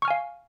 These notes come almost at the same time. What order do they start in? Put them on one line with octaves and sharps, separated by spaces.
C#6 F6 G#5 F5